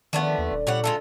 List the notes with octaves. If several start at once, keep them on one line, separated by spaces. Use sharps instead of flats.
D3 D#3 F3 A3 B3 D5
D#2
D#1
A#2 G3 C#5 F#5
G#3 F4 A4